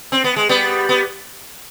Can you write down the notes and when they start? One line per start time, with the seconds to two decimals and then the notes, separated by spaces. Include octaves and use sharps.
0.12 C4
0.24 B3
0.36 G#3
0.49 G3 B3
0.89 B3